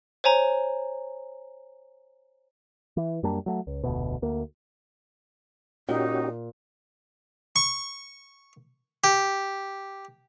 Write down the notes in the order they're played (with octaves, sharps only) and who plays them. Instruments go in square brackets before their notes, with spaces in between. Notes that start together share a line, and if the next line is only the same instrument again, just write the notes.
[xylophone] C5 C#5 G#5 A#5
[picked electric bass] E3
F#2 G3 A#3 D4
F#3 A3
C#2
F1 D2 B2
D2 A#3
[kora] A#2 [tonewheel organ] C#4 F#4 G4 [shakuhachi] D#4
[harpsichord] C#6
G4